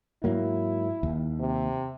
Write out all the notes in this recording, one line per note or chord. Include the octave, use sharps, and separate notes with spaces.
G#2 F#3 A#3 E4
D#2
C3